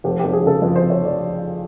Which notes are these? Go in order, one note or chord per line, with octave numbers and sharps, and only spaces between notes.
F1 G4
F1 G4
G#4
C#3 A4
F2 B4
C5
F1
C#5
F1
D5